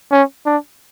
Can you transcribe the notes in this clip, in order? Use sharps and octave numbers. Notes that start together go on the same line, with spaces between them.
C#4
D4